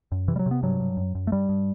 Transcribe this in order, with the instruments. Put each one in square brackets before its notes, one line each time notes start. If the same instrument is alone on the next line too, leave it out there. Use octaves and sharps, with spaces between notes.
[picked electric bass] F#2
C3 E3
G3
F#3
C3 B3
G2 F#3
G2
F#2
F#2
A3
G2 G3
G2